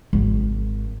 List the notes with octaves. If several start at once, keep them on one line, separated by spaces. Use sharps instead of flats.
G#1 D#3